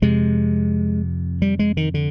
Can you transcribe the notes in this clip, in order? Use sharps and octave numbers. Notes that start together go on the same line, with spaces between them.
F2 C3 G#3
G3
G#3
D#3
D3